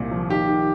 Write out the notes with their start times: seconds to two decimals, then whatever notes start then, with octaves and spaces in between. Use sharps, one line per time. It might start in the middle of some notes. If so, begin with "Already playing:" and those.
Already playing: C2 A#2
0.11 F3
0.30 D#3 G4
0.49 D#3